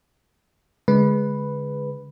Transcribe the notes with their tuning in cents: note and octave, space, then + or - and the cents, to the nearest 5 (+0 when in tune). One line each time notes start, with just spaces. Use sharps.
D3 -35 G#3 +0 B4 +0